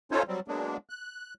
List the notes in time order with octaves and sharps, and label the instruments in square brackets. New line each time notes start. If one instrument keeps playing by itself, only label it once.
[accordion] C#4 D#4 F4 A4 C5 C#5
F#3 G3 C4
F#3 G#3 A#3 B3 D4
F#6